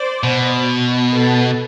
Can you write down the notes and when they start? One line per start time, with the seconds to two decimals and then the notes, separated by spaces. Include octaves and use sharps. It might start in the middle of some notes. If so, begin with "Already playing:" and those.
Already playing: C5 D5
0.23 B2
1.13 A4 B4